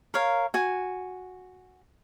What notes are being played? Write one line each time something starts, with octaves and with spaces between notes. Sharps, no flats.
A#4 C#5 F5
F#4 G#5